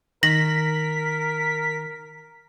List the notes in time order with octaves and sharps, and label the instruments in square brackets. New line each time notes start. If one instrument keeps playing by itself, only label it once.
[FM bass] D#3 [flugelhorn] A#4 [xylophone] A#6 F#7 [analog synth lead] B6